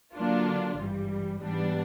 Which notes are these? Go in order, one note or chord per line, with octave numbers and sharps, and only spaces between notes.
D3 F#3 A#3 D4 F4
G#1 G2 E3 G3
G#2 E3 G3 B3 D4